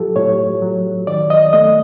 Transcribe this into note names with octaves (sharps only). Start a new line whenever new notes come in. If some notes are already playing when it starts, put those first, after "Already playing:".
Already playing: A2 F#3 F4 G4 A4
A2 C#5
F#3
D#3 D5
D#5
A3 D#5